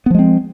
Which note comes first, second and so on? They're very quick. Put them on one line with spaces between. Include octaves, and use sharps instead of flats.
B3 F3 G#3 C4